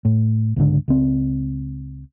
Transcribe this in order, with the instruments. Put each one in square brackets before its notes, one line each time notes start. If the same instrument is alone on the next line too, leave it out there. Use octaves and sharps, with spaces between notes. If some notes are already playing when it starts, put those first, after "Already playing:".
[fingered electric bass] A2
C#2 G#2 D3
C#2 C4